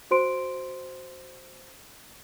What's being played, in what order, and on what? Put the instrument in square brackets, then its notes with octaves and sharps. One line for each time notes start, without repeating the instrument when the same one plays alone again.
[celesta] F#4 C5 C6 D7